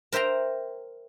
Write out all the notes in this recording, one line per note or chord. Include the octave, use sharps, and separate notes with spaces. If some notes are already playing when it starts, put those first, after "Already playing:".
A#4 C5 E5 G5 A#5